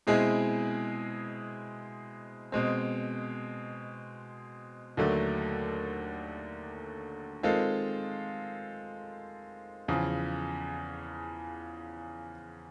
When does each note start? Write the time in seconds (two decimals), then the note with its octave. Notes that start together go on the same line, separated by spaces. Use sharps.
0.07 B2 G#3 C4 E4 G#4
2.52 B2 G#3 C4
4.97 D#2 D3 F#3 A3
7.43 D#3 G#3 C4 F4 A4
9.88 E2 C#3 F3